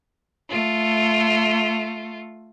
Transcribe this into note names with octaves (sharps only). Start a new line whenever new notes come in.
A3 F4